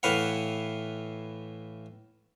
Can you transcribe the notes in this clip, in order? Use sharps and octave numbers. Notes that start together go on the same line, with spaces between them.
A2 E3 B4 F5 F#5